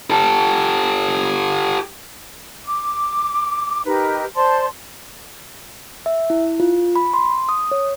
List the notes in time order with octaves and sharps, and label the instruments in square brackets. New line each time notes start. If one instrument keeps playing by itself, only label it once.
[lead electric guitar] G4 A4
[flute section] D6
D#4 G4 A#4 B4
C5 D5 A5 C6
[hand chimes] E5
E4
F4
B5
C6
D#6
C#5